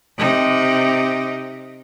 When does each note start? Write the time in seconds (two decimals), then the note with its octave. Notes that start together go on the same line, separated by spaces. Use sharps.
0.18 C3 D#4